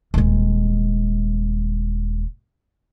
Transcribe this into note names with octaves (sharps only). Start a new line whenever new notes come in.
D#1 G#3